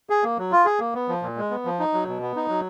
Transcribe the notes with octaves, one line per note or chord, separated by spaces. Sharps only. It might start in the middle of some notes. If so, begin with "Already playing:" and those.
G#4
A#3
F#3
F4
G#4
A#3
B3
F3
A#2
G#3
B3
F3
D#4
F#3
B2
B3
D#4
F#3